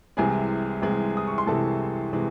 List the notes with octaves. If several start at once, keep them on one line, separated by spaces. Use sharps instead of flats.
C2 C3 E3 G#3 G#4 G#5
C2 C3 E3 G#3
D#6
C#6
C6
C2 C3 E3 G#3 A4 A5
C3 E3 G#3